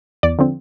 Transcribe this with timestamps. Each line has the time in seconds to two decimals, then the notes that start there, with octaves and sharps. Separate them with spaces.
0.23 E2 D5
0.39 D3 F3 C4